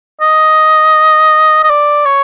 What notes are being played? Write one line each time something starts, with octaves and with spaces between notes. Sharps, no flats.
D#5
D#5
D5
C#5